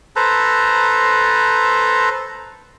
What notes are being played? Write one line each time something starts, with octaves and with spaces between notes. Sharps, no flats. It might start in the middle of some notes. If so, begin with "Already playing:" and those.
A4 B4 C5 A#5